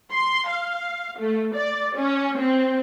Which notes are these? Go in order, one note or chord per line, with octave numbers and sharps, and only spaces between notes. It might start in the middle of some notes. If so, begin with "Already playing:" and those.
C6
F5
A3
D5
C#4
C4